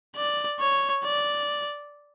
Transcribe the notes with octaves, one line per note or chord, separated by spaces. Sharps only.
D5
C#5
D5